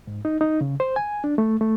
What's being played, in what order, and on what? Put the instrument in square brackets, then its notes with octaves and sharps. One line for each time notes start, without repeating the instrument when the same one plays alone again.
[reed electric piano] G#2
D#4
D#4
C#3
C5
G#5
D4
A3
A3